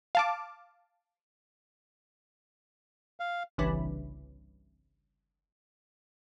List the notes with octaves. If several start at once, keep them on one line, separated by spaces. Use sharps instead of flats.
F5 A5 D6
F5
G1 C2 C#3 E3 D4 B4